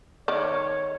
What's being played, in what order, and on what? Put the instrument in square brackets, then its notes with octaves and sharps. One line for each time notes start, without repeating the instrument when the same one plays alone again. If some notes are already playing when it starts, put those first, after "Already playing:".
[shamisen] D#3 D5 [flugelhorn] C#5